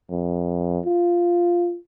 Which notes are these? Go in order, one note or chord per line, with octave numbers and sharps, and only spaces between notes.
F2
F4